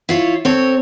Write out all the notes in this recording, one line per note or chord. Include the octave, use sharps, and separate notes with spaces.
E4 F4 C#5
C4 A4 C#5